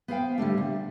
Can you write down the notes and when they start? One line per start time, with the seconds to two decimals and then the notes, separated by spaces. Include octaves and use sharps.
0.08 B3 C5 F5 G5
0.38 D3 G3 A3 D4
0.58 C3